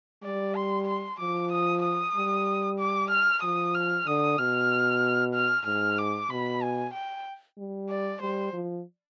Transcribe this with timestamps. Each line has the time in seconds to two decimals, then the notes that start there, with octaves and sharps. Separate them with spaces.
0.23 G3 D5
0.56 C6
0.87 C6
1.19 F3 D6
1.51 D#6
1.83 D#6
2.16 G3
2.79 D6
3.10 F6
3.43 F3 D#6
3.74 F6
4.06 D3 D#6
4.38 B2 F6
5.34 F6
5.65 G#2 F6
5.98 D6
6.30 B2 B5
6.62 G#5
6.93 G5
7.58 G3
7.89 D5
8.21 G3 C5
8.53 F3